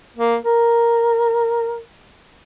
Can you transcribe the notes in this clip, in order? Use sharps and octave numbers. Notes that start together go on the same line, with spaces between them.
A#3
A#4